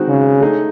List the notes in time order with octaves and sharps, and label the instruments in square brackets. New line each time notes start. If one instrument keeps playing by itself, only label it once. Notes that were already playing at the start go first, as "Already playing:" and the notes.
Already playing: [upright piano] D#3 G#3 C4 D#4 F#4
[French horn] C#3
[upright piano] A3 D#4 G#4